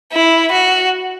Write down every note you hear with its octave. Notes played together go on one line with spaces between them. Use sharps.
E4
F#4